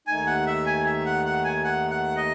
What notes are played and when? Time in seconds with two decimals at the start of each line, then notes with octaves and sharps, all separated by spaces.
0.07 D#2 D#3 A3 D#4 G#5
0.27 F#5
0.47 E5
0.66 G#5
0.86 E5
1.06 F#5
1.25 F#5
1.45 G#5
1.64 F#5
1.91 F#5
2.17 D#5